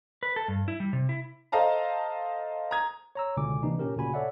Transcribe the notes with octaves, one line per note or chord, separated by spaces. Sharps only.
B4
A4
G2
E4
G3
C3
E4
A4 C5 D#5 F5 A5 A#5
A#5 D#6 G#6
C#5 A#5 E6
C#2 B2 D3 G#5 D6
C3 E3 A#3 D4 D#4
A#2 C#4 G4 A#4
D2 A#2 C#3 F#4 G#5 B5
A4 C#5 D5 E5 F#5